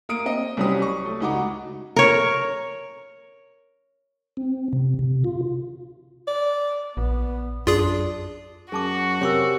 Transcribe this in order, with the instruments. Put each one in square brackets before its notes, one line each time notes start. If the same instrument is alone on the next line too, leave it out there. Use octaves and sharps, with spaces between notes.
[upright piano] A#3 D#6 D7
C4 D#5
C2 F#3 G3 C4 C#4 D#6
C#6
A3
C#2 D#4 F#4 D6
[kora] A#4 C#5
[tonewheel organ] C4
C3
C3
F4
[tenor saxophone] D5
[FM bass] A#1 [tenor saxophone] B3
[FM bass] F#2 [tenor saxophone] D4 [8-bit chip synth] F4 G#4
[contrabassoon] F#2 [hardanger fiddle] F#4 [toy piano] G#4 A5 D6
[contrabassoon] C3 [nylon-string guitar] G4 A#4 G#5 [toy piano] C#5 C#6 E6